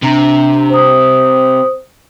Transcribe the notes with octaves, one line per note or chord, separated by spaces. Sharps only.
C3 D4 A#5
C5 D#6